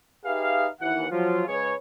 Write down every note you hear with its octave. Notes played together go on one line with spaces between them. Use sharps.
D#4 G4 G#4 B4 E5 F5
D#2 E3 F#5
F3 F#3 F4
C#3 G#3 G#4 B4 C#5